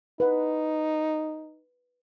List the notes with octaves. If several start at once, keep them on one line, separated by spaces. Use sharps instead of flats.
D#4 B4 F#5